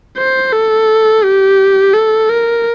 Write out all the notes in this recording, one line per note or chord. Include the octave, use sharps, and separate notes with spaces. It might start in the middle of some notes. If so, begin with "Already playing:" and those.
C5
A4
G4
A4
A#4